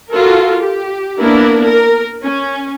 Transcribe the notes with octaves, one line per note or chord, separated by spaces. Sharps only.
F4 F#4 A4 A#4
G4
A#3 B3 D4 E4 A#4
A#4
C#4